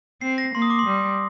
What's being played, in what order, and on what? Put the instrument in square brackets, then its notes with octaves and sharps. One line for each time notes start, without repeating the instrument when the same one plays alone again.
[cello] C4 [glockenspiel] C7
[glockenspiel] A#6
[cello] A#3 [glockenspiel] C6
[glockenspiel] D#6
D6
C6
[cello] G3